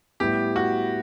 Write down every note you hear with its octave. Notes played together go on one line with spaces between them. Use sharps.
A2 G3 B3 E4 G4
F#4